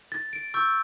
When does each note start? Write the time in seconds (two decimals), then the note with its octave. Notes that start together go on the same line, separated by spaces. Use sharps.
0.12 A6
0.33 D7
0.54 C#6 E6 G6